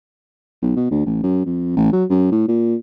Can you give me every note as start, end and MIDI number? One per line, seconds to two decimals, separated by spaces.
0.62 0.75 35
0.76 0.88 47
0.91 1.04 38
1.06 1.21 33
1.23 1.43 42
1.45 1.75 41
1.76 1.92 33
1.92 2.04 54
2.09 2.27 42
2.32 2.45 45
2.48 2.75 46